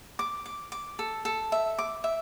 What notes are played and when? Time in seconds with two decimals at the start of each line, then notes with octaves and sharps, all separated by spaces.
0.19 D6
0.46 D6
0.72 D6
0.99 A4
1.25 A4
1.52 E5
1.78 D6
2.04 E5